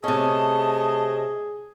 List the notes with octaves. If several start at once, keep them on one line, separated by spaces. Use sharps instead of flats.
C3 A3 C#4 G#4 D#5 A5